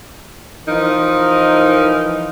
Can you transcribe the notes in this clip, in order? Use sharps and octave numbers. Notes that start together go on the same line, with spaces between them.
E3 F3 D#4 A#4